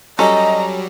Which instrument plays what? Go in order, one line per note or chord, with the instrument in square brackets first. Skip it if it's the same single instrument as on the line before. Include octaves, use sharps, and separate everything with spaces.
[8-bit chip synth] F#3 G3 [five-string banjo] C#4 A4 [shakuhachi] D#5 [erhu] A#5